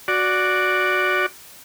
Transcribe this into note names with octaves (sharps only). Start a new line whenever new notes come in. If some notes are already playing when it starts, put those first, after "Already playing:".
F#4 D5